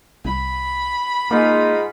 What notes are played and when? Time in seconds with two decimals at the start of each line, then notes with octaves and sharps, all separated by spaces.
0.25 C2 B5
1.31 G#2 A#3 D#4 F4